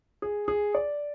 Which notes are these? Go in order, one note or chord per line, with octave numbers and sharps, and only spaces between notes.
G#4
G#4
D5